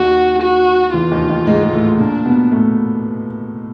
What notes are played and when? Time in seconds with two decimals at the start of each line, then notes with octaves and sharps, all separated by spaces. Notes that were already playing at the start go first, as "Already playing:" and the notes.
Already playing: D#2 D#3 F#4
0.42 F#4
0.94 E2 E3 F4
1.11 D#2 D#3
1.29 D#2 D#3
1.47 G#2 G#3
1.63 G#3
1.72 A2 A3
1.99 A#2 A#3 D4
2.25 B2 B3
2.52 A2 A3